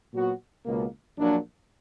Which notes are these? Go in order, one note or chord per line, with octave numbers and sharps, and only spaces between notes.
A#2 F#3 B3 F#4
C#2 B2 A#3
A#1 A#2 F#3 A#3 D4